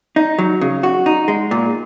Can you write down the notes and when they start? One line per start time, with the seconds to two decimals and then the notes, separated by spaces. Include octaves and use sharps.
0.16 D#4
0.38 F#3
0.61 C#3
0.83 F#4
1.06 D#4
1.28 G#3
1.51 A#2